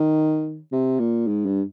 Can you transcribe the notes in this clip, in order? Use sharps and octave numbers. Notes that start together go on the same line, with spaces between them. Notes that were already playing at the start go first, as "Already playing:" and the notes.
Already playing: D#3
C3
A#2
G#2
G2